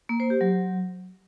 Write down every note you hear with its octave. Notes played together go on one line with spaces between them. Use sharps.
A#3
C5
G4
F#3